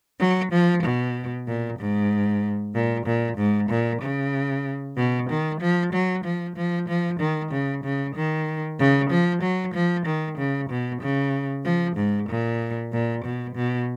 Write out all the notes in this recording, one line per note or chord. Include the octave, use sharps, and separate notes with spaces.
F#3
F3
B2
A#2
G#2
A#2
A#2
G#2
A#2
C#3
B2
D#3
F3
F#3
F3
F3
F3
D#3
C#3
C#3
D#3
C#3
F3
F#3
F3
D#3
C#3
B2
C#3
F3
G#2
A#2
A#2
B2
B2